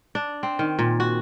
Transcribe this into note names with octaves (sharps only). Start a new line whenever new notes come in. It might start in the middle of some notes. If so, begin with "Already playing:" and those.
D4
C4
D#3
A#2
F#4